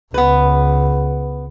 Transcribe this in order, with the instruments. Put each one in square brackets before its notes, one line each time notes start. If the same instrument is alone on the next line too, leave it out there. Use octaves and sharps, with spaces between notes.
[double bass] C#2 [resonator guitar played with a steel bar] B3 B4